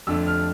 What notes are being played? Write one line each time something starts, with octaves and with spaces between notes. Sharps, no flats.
F2 D3 A3 E6
F6